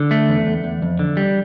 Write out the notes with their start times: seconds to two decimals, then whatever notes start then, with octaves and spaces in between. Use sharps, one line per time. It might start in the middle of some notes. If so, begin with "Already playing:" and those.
Already playing: D3
0.11 A3
0.29 E2
0.47 E2
0.64 E2
0.82 F2
0.99 D3
1.17 G3